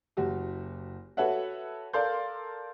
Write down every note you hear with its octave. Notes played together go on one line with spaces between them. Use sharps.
F#1 F#4 G4
F#4 A4 B4 C#5 E5 F#5
A4 A#4 D5 F5 C6 G6